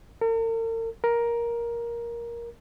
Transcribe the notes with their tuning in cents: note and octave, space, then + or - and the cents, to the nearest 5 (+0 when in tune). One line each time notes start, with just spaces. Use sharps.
A#4 -45
A#4 +10